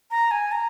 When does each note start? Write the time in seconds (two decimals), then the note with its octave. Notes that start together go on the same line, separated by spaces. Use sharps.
0.11 A#5
0.31 G#5
0.52 A#5